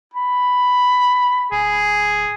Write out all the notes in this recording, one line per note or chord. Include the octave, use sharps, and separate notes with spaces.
B5
D1 G#4